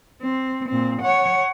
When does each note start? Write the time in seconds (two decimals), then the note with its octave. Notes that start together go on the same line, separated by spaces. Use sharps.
0.22 C4
0.68 A#2 C4
1.02 C#5 F#5